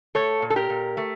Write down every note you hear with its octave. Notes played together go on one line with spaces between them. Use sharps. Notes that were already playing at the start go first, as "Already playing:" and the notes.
A3 A4 C#5
A#2
A4
G4 A#4
A#2
A3